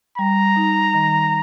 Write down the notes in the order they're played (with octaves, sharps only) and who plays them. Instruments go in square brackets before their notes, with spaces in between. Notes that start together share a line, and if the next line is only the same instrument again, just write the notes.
[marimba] G3 [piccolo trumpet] A#5
[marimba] D#4
D#3